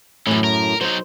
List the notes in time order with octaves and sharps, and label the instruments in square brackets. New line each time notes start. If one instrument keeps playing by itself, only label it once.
[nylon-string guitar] F#2 A2 [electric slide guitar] E3 C#4
[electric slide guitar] A#4
[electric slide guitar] F#3 D#4 [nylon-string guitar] C5